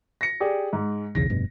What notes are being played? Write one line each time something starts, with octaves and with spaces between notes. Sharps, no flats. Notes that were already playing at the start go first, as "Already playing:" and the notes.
A#6 C#7
G4 G#4 D5
G#2
B1 E2 C#3 A#6
F1 G2 B2